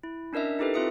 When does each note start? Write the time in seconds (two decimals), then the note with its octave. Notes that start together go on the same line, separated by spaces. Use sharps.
0.03 E4
0.33 C#4 D4 A#4 D#5 E5
0.59 D#4 E4 G4 A4 B4
0.74 C4 F4 E5 D#6 C#7